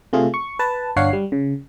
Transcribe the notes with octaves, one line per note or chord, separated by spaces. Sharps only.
C3 A3 F4 G#4
C#6
B4 A5
G1 D4 C#5 F5 F#5 C7
G3
C#3